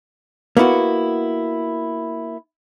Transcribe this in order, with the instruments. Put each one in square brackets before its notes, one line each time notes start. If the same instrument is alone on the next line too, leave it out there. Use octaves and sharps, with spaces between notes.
[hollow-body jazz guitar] A#3 B3 E4 F#4